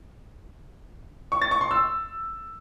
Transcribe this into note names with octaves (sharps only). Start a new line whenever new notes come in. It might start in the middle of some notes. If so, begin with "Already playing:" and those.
C#6
A6
C#6
C6
E6